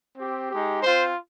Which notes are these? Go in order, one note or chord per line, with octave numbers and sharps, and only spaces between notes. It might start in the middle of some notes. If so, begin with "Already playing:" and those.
C4 G4
G#3 D#4 G4
C4 F4 C5